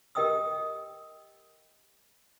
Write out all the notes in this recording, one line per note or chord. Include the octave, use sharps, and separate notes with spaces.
G4 A#4 D#5 G5 D#6 E6